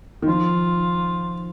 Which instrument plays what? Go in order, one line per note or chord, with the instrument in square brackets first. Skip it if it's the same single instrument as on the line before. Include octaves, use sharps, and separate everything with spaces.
[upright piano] D#3
[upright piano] F3 [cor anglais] F4